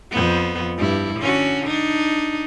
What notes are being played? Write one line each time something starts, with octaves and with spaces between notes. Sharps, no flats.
F2 B3
G2 E4
D3 C#4 F#4
D4 D#4